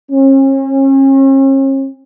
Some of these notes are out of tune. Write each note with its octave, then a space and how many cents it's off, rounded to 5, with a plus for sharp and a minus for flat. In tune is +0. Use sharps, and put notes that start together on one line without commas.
C#4 -45